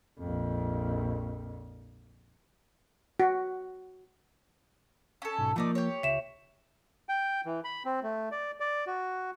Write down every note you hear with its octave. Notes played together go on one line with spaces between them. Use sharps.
A#1 F2
F#4
C#4 A4
B1 G#2
F3 A3 A#3 D#4 D5
G4 C#5
C#2 E5 E7
G5
E3
B5
C4
A3
D5
D5
F#4